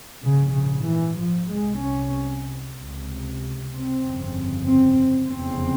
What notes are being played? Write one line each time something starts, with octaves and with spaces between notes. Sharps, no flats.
A#1 G#2 C#3
C#3
E3
F3
C2 C3 G#3
C#4
C#2 C3
C4
G1 F2 C#3
C4
F1 E2 C#3 C4